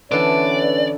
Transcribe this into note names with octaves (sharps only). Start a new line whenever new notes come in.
D3 E3 B3 C#4 B4 C#5 D5 A5